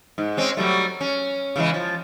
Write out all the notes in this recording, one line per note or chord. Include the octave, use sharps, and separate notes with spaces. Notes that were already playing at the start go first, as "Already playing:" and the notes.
G#2
G#3 C4 C#4
F#3 G3 A3
C#4
C#3 E3 G#3
F3